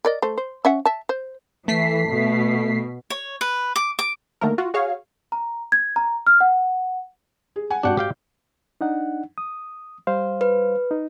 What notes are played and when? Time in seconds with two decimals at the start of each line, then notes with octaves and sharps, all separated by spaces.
0.05 A#4 D5 D#5
0.22 A3 C5
0.38 C5
0.65 C#4 E5 F#5
0.85 E5 A5
1.09 C5
1.68 E3 A3 B6 C7
2.10 B2
3.10 C#5
3.41 B4
3.76 D6
3.99 D6
4.41 D3 D#3 A3 A#3 A#4
4.58 F4 F#4
4.74 F#4 G#4 C#5 F5
5.32 A#5
5.72 G#6
5.96 A#5
6.27 F6
6.41 F#5
7.56 G#4
7.70 F#5 G#5
7.83 G#1 D4 F#4 F#5 G5
7.97 G4 F5 G5
8.81 D4 D#4 F#5
9.38 D#6
10.07 G3 C5 F5
10.41 B4
10.91 D#4